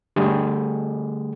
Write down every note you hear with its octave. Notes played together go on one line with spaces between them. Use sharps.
D3 G3 A3 G#4